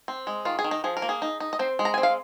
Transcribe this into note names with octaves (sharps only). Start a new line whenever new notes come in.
C4
G#3
D#3 F4
G#4
D#3
D#4
F3 G#4
A#4
A#3
G#4
D#4
D#4
D#5
C4 C5
G#3
A#5
C4 G#5
F5